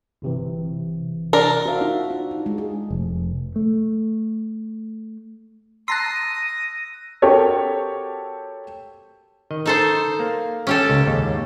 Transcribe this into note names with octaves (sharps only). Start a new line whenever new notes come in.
G1 C3 E3
D4 A#4
F#4 A#4 C5 E5 F5
D4 D#4 F4 F#4
D4
D#4
G#3
G#4
F1
A3
A5 A#5 C6 D#6 E6 F#6 A#6
C4 F#4 G4 A4 A#4 C#5
D#3 D#5
D#4 A4 C5
A#3
C#4 G4 A4
C#2
D#2 G#2